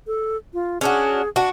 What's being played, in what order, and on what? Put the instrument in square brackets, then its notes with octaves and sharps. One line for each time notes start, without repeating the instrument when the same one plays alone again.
[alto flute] A4
F4
[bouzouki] C#4 D4 F#4 [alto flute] G#4
[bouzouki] D4 F#4